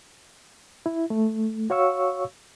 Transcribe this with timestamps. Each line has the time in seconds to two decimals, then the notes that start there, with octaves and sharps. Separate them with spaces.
0.86 E4
1.10 A3
1.70 F#4 C#5 F5 C#6 E6